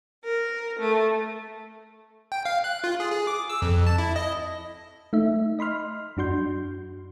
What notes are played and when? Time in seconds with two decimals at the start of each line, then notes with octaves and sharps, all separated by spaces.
0.24 A#4
0.79 A3
2.32 G5
2.45 F5
2.64 F#6
2.84 F4
3.00 G#4
3.12 G#4
3.27 D6
3.50 E6
3.62 F2
3.87 A5
3.98 E4
4.16 D#5
5.13 A3 D#4 E5
5.59 D#5 B5 C6 F6
6.17 F#2 D4 F#4 C6 G6